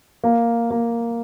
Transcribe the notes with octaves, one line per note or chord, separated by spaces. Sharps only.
A#3
A#3